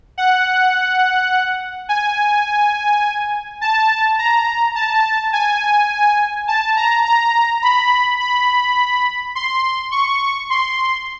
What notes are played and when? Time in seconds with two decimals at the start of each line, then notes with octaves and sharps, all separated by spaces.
0.18 F#5
1.89 G#5
3.61 A5
4.19 A#5
4.75 A5
5.33 G#5
6.48 A5
6.77 A#5
7.05 A#5
7.62 B5
8.20 B5
9.35 C6
9.92 C#6
10.50 C6